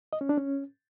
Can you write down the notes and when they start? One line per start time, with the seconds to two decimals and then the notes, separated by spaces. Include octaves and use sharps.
0.13 D#5
0.21 C#4
0.29 D4
0.38 C#4